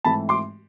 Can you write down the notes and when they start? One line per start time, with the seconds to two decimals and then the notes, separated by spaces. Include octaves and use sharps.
0.04 G#2 E3 A3 C4 A5 B5
0.29 C6 D6